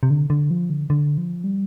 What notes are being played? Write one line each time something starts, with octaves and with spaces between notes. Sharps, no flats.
C3
D3
D3
F3
D3
D3
F3
G3